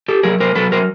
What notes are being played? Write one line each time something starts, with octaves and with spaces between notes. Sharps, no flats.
G4 A4
F#3 G#4 A#4
A#4 C5
F#3 A4 B4
A#4 C5